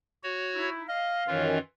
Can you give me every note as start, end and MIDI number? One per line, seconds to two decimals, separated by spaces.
0.23 0.70 66
0.23 0.70 73
0.55 0.84 63
0.55 0.84 64
0.88 1.23 75
0.88 1.44 77
1.27 1.59 42
1.27 1.59 51
1.27 1.58 52
1.27 1.59 61
1.27 1.58 65